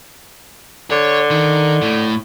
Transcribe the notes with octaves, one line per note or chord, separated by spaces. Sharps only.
D3 C#5
D#3
A2